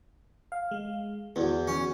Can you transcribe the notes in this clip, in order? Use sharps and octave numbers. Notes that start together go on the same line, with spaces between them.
F5
G#3
E2 B3 F#4
C#4